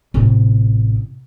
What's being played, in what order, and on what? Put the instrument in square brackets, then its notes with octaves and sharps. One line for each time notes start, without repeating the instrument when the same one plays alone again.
[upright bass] A1 C3